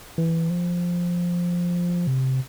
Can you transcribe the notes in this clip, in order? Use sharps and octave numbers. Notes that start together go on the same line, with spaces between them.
E3
F3
C3